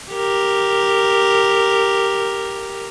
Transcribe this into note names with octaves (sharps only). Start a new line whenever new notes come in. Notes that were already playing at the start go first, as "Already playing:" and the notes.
G4 A#4